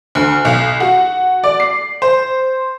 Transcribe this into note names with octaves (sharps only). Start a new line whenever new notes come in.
D2
B1
F#4
D5
C7
C5